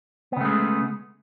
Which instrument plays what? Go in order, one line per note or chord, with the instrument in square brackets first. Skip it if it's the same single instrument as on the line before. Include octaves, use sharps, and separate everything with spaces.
[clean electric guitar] B3
C#3
A3
G#3